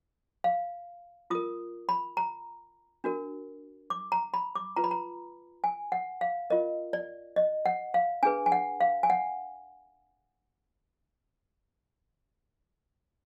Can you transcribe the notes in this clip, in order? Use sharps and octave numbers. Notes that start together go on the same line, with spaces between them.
F5
F4 A#4 D#6
B5
A#5
D4 F#4 A#4
D6
A#5
B5
D6
F4 B4 A#5
B5
A#5
G#5
F#5
F5
F4 A#4 D#5
D5
D#5
F#5
F5
D4 G#4 B4 G#5
G#5
F#5
F5
G#5
F#5